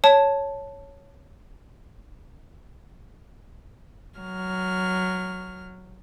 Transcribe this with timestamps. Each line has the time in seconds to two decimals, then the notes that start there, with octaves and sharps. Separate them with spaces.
0.04 C#5 A5
4.19 F#3 F6